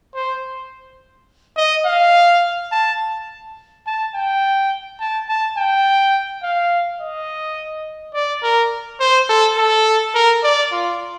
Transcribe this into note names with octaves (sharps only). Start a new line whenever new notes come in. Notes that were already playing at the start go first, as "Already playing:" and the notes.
C5
D#5
F5
A5
A5
G5
A5
A5
G5
F5
D#5
D5
A#4
C5
A4
A4
A#4
D5
F4